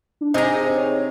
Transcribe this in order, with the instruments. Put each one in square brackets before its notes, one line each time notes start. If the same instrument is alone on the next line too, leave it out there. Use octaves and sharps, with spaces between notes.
[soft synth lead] D4
[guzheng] C3 A#5 [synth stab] D#4 G#4 [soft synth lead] C5
[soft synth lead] C#5